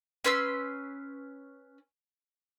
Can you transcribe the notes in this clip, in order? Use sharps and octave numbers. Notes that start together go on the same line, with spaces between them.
C#4 B4 C6 E6